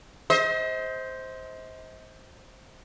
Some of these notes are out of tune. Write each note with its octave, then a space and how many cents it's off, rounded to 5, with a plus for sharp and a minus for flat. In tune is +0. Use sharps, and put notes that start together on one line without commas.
C5 +0 D#5 +40